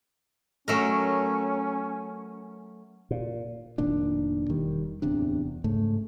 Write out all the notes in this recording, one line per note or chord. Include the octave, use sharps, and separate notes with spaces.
F#3 A3 C#4 A#4
A#2
F1 A#2 D#3 D4
E1 D#3 G3
D1 E2 C3 D4
G#2 C#3 A3